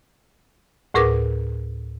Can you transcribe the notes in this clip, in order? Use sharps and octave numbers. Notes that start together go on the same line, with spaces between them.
D2 A2 G#4 A#4 B4 D6